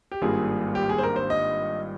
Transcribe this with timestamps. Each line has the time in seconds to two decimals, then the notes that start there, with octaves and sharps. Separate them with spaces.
0.11 G4
0.21 G#1 G2 G3 A#3 F4 G#4
0.75 G4
0.89 G#4
0.98 C5
1.03 A#4
1.16 C5
1.30 D#5